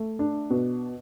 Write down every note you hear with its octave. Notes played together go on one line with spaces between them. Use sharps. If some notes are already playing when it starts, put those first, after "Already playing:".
Already playing: A3
D4
B2